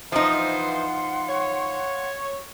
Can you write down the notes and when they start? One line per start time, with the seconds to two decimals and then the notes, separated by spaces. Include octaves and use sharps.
0.12 E3 F3 D#4 C5 F5 F#5 C6
1.29 C#5